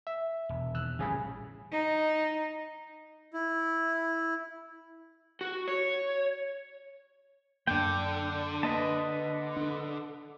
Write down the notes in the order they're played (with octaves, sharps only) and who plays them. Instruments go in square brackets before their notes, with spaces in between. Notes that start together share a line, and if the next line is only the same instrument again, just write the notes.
[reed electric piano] E5
[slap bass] E1
[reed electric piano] D#2 E6 F#6
[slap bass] A1 A2 G3 [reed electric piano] C#3 G#4 B5
[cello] D#4
[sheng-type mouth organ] E4
[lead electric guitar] F#4
C#5
[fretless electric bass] F#2 A#3 [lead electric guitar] D3 [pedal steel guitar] D4 G5
[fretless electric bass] A#3 [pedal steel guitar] B4 D#5 A5
[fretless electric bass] D4